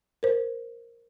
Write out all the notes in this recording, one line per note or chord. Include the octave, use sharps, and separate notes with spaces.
A#4 C5